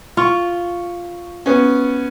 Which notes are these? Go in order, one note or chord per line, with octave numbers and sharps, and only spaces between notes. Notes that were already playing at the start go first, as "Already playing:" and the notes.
F4 C#6
B3 C#4